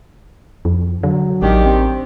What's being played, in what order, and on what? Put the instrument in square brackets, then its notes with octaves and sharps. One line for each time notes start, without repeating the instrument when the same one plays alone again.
[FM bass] F2
[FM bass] D3 [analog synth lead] F#3
[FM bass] A1 [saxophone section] D#3 D4 G4
[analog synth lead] C4